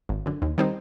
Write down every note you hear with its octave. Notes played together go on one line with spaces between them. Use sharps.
G#1
F#2 D3
D#2
D#3 G3 C4 D#4